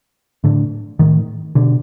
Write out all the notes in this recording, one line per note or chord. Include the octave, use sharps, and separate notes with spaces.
A2 D3
A2 D#3
B2 D3